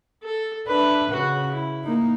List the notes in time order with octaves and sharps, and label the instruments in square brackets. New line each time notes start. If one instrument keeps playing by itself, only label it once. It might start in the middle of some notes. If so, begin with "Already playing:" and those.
[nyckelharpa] A4
[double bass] D4 [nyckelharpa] B4 E5
[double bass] C#3 [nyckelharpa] F#4 F#5
[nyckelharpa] E4
[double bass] A#3 D#4